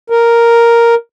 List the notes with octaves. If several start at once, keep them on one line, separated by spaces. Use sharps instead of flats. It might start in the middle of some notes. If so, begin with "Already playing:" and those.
A#4